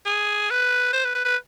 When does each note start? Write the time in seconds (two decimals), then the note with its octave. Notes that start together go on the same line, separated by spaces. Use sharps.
0.06 G#4
0.50 B4
0.93 C5
1.04 B4
1.15 B4
1.25 B4